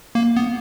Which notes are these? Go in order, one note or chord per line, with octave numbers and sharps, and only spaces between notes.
A#3
B3